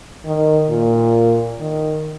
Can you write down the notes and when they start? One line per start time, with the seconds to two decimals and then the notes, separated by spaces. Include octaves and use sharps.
0.25 D#3
0.70 A#2
1.60 D#3